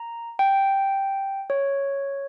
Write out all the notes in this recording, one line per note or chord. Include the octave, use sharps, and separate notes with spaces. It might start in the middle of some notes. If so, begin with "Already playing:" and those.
Already playing: A#5
G5
C#5